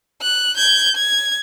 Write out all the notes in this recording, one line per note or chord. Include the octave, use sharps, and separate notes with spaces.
F#6
G6 G#6
G#6